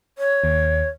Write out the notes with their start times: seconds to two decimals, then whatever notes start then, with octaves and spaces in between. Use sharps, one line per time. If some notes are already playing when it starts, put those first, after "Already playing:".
0.18 C#5
0.44 D#2